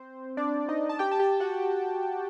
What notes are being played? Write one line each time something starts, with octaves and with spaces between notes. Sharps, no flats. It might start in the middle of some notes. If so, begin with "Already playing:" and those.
Already playing: C4 C5
D4 D5
D#4 D#5
A5
G4 G5
A5
G4 G5
F#4 F#5